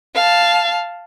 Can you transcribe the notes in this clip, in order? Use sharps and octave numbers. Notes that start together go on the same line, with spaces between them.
F5 A5